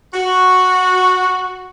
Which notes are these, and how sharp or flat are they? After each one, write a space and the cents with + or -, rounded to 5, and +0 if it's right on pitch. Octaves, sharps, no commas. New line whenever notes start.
F#4 -5